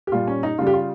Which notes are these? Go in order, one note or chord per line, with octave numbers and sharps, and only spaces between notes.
G4
A#2 G3 F4
C#4
D#4
C#3 G3 F4
G4
F4